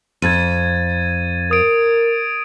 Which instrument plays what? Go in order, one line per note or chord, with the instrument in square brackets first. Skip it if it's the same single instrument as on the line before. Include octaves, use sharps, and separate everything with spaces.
[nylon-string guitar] F2 [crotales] G#6 A6 D#7
[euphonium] A#4 [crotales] D#6 D7